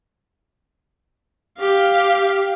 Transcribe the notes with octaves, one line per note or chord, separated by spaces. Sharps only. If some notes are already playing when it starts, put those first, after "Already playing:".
G4 F5